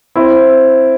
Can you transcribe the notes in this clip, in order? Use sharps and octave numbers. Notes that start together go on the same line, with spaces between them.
C4 E4